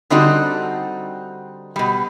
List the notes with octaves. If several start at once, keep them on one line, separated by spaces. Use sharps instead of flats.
D3 G3 C4 D#4 F#4 A4
B2 G3